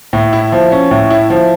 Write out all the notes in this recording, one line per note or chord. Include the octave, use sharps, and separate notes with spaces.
A2
E4
F3
C#4
A2
E4
F3